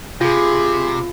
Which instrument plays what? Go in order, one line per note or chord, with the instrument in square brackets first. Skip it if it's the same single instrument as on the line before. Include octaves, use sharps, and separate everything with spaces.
[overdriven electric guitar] C3 [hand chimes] F4 [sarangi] G#4